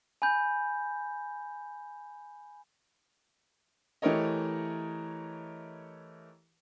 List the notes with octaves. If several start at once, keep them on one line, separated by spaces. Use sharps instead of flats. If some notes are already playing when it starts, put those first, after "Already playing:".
G#5 B5 G6
E3 A3 G4 A#4 C#5 D#5